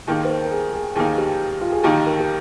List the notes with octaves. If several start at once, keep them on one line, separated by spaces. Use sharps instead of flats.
D#2 D#3 A#3 D#4 G#4
C5
A#4
A#4
G#4
G#4
D#2 D#3 A#3 D#4 G#4
G4
F4
G#4
D#2 D#3 A#3 D#4 G4
A#4
G4